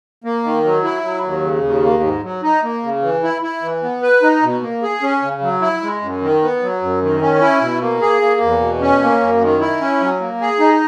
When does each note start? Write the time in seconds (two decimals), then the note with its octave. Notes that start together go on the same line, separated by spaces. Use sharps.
0.24 A#3
0.43 D#3
0.64 F#3
0.84 E4
1.03 F#3
1.23 D#2
1.43 C#3
1.63 D#2
1.83 A#3
2.03 G#2
2.23 F#3
2.42 D#4
2.63 A#3
2.83 C#3
3.02 E3
3.23 E4
3.42 E4
3.62 E3
3.83 B3
4.03 B4
4.22 D#4
4.43 B2
4.62 A#3
4.83 G#4
5.02 C#4
5.22 C#3
5.42 F#3
5.61 E4
5.82 G#3
6.02 F#2
6.21 D#3
6.42 B3
6.62 F#3
6.82 F#2
7.02 D#3
7.21 C#4
7.41 E4
7.61 B2
7.81 A#3
8.01 G#4
8.22 A#3
8.41 E2
8.60 B2
8.81 C#4
9.01 A#3
9.21 F#2
9.41 D#3
9.60 E4
9.80 C#4
10.00 F#3
10.20 A#3
10.40 G#4
10.60 D#4